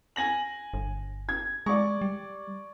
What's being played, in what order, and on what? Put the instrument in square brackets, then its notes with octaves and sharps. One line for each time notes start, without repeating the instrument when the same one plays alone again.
[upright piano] G#5 A#6 F#7
[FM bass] G1
[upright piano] G#6
[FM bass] G#3 [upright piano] D5 C#6
[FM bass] G3